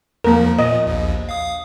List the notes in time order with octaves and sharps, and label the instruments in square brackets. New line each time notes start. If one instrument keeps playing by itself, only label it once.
[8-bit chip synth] E2 F3 [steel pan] A#3 A#4
[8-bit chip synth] A#2 [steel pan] D#5
[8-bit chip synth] A#1 D#2
F5 D#6